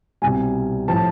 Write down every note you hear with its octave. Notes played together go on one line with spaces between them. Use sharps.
C2 B2 G3 G#5
A2 F3 A5